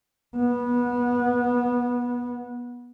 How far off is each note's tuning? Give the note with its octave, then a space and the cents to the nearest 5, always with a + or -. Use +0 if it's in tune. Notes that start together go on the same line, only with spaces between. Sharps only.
B3 -20